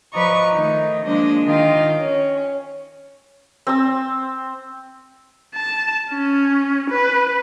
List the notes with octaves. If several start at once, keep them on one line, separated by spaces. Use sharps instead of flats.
F3 B4 D5 D#5 A#5 C#6
D#3 A3 D#4
F3 G#3 A#3 D4 D#5
D#3 F4 D#5 F5 G5
C#4
C4 E6
A5
C#4
B4